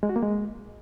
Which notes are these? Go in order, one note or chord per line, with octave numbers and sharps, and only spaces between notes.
G#3
F#4
A#3
G#3